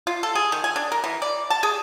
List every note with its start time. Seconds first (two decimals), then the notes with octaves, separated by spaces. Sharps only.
0.07 F4
0.23 A4
0.35 G#4
0.52 D#3
0.64 G#5
0.76 D4
0.92 A#4
1.04 E3
1.22 D5
1.50 A5
1.63 G#4